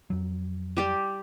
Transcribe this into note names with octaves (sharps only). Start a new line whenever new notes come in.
F2 F#3
G3 G4 D5